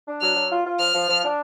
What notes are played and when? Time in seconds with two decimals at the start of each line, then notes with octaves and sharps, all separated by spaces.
0.08 D4
0.21 F#3 F6
0.36 F#3
0.51 F4
0.65 F4
0.79 F3 F6
0.94 F3
1.08 F3
1.23 D4